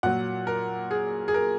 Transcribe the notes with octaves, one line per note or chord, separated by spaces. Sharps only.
A#2 F#3 F#5
A#4
G#4
G#4
A#4